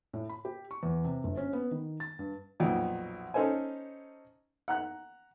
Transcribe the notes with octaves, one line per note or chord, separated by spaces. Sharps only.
A2
B5
G4
C#6
E2
C3
G1
C#4
B3
D#3
A6
G2
B1 F2 A#2
C#4 D#4 A4 C5 G#5
F#5 A#5 F#6